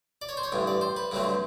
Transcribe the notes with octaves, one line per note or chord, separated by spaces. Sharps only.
D5
C#5
C5
C#5
A1 G2 D3
D5
C5
B4
G2 D3 F#3 A3 C4